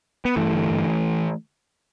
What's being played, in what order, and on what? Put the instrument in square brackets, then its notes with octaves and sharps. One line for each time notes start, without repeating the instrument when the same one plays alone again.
[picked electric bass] B3
G2 E3 A3
D3
G2